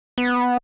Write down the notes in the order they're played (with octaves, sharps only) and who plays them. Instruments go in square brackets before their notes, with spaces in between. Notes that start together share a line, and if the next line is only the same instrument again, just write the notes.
[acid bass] B3